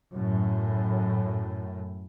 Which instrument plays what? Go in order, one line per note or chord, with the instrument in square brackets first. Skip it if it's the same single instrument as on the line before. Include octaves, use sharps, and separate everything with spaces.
[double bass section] F#2 A2